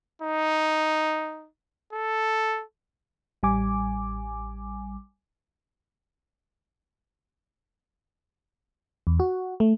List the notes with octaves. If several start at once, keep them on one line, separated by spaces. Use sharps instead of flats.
D#4
A4
A1 G3 G#5 D6
E2
F#4
A3